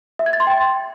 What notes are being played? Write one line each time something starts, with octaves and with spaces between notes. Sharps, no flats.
E5
G#6
A6
C6
G5